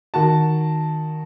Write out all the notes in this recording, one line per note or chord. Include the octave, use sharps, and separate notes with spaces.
D#3 F#4 A5